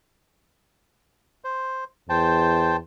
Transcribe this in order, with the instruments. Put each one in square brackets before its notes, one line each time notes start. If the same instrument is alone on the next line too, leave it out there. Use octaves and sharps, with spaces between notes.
[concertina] C5
[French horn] E2 [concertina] C5 G5 A5